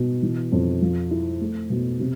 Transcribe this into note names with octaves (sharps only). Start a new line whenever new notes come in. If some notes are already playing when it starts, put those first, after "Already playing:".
Already playing: B2
E3
F2
F3
E4
A3
B2
C3